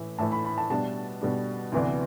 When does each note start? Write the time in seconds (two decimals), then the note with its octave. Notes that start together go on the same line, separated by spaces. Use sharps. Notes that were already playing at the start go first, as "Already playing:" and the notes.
Already playing: A2 E3 A3 E4
0.18 A2 E3 A3 E4 A5
0.32 B5
0.45 B5
0.58 A5
0.70 B2 G3 D4 A5
1.21 B2 G3 D4
1.72 D2 C3 E3 B3 D4